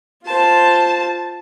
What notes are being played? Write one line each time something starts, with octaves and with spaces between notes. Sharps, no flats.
F4 C5 A5